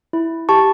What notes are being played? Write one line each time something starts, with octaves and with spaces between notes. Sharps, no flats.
E4
G4 A5 C#6